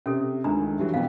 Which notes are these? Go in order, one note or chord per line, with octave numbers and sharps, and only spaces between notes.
C3 C#4 A4
C#2 D#3 A3 D4 A#5
G2 E3 F#3
F2 B2 F5 G5